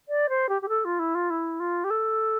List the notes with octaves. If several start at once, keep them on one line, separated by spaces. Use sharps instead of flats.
D5
C5
G4
G4
A4
F4
E4
F4
E4
F4
G4
A4